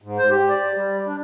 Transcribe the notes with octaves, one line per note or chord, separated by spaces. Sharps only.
G#2
C5
G4
D5
G3
D4